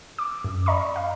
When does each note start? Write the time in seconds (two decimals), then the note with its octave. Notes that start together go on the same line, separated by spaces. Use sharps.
0.19 D6
0.44 F#2
0.66 D5 D#5 A#5 B5 C#6
0.96 F5